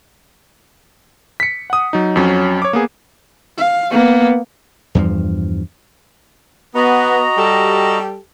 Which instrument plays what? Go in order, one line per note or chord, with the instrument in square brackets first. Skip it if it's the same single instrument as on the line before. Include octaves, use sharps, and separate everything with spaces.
[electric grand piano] B6 C#7
F#5 D#6
F#3 D#4
F2 F#3 C#4
C#5 D6
A#3 B3 G#4
[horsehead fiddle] F5
A#3 B3
[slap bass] E2 G2 F3
[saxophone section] B3 [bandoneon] F#4 D#5 A#5
[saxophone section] G3 G4 A4